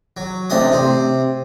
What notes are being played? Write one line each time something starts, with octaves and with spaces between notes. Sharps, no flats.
F#3
A1 C3 D4 D#5 D#6
C3 C4